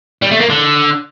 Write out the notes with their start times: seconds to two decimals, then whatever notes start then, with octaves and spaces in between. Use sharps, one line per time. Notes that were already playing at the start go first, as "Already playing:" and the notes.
0.22 G3
0.31 A3
0.40 A#3
0.50 D3